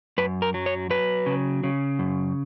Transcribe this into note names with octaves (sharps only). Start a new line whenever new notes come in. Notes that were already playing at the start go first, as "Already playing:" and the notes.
F#2 B4
A#4
F#3
C#5
F#3 B4
C#3
C#3
F#2